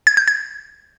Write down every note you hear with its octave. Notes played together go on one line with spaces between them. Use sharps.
G#6
G6
G#6